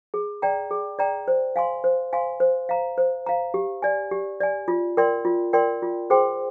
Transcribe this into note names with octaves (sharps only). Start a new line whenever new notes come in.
G#4
D5 G5 A#5
G#4
D5 G5 A#5
C5
F5 G#5 C6
C5
F5 G#5 C6
C5
F5 A#5
C5
F5 A#5
G4
D5 G#5
G4
D5 G#5
F4
A#4 D5 G5 C6
F4
A#4 D5 G5 C6
F4
G#4 C5 G5 C6